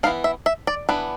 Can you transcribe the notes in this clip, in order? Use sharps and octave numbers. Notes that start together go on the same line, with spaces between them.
E3 B3 D4 F5
E5
E5
D5
E3 B3 D4 B4